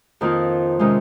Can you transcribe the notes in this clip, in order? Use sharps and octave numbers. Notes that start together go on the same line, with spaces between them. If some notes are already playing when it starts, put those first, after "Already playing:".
F2 D#3 A#3 F4
C3 D#3 G#3 C#4